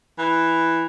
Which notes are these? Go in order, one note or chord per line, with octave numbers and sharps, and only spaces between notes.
E3